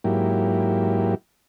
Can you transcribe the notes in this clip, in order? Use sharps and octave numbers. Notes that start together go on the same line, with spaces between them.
G#2 F#3 A#3 E4 G4